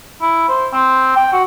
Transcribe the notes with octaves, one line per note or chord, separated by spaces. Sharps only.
E4
C5
C4
G5
F#4